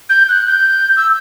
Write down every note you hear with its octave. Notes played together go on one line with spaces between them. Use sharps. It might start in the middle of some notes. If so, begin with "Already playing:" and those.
G6
F#6
G6
E6